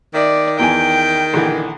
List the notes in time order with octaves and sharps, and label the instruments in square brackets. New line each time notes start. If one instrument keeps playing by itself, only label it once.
[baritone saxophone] D#3 [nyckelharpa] D5 [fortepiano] E5
[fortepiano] E2 E3 G#5 [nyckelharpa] G5
[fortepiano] A#1 D3 E3